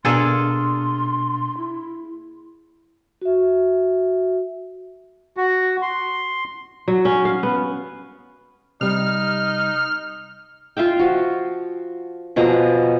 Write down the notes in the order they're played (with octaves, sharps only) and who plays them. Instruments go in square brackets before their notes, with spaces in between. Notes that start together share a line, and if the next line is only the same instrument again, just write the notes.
[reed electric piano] B2 D4 F6 [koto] A#3 G#4 A4 [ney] C6
[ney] E4
[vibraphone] F#4 E5
[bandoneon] F#4
C6
[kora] F#3
C#4
F5
B3
[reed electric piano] C3 G3 [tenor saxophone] D#4 [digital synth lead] F6
[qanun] F4 E5 F5 G5
F3 F#4
B2 F3 G#4 A#5